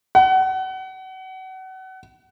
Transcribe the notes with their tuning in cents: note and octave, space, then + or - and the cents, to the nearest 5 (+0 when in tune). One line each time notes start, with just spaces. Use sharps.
F#5 +30